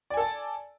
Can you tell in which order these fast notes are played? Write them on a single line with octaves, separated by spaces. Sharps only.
D5 G#5 A4 A5